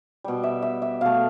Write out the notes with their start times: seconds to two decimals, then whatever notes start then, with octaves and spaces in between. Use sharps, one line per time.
0.24 B2 G3
0.43 E5
0.62 E5
0.82 E5
1.01 B2 A3 F5